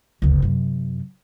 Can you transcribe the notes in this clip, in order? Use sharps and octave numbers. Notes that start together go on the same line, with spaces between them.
F#1 D2
F#2 C3